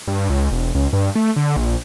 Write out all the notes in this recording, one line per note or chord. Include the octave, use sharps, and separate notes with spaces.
G2
C#2
E1
C#2
G2
A3
D3
A#1